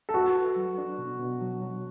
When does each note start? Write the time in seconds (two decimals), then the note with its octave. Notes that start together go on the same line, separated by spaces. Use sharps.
0.09 A4
0.14 F#4 B4
0.36 B4
0.56 F#3
0.78 D4
0.98 B2
1.19 B2
1.41 F#3
1.62 F#3